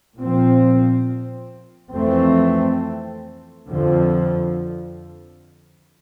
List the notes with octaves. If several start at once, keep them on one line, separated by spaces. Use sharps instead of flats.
A#2 F3 C4
F2 E3 A3 C4
F2 D3 F3